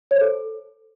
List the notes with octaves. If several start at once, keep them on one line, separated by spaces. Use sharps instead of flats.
C#5
C5
A4